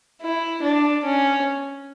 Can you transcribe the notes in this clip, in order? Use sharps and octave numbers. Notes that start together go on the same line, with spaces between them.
E4
D4
C#4